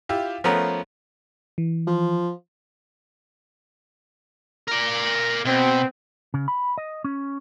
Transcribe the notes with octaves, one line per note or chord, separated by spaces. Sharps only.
E4 F4 G4
F3 A3 B3 C#4 A#4
E3
F3
A#4 D5
B2 C4
C#3
B5
D#5
C#4